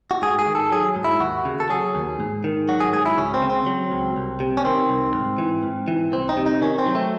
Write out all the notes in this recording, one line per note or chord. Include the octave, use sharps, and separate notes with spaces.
F#4
G#2 G#4
G#4
D#3
A4
F#3 G#4
G#2
E4
D#2 F#4
C#3
A4
F#3 G#4
D#2
G#2
D#3
F#3 F#4
G#4
G#2 G#4
E4
C#2 C#4
C4
C#3
C4
F#3
C#2
C2
C3
C#4
D#3 C4
C2
G#2
E3
G#2
E3
C2 C4
D#4
C3
D#4
D#3 C#4
C4
F#3
A3